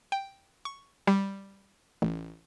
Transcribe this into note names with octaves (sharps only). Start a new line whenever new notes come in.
G5
C#6
G3
A1